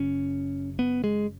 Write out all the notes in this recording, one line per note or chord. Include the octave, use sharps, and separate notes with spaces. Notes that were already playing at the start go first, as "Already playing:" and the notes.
Already playing: F#1 F#2 C#3 C#4
B3
G#3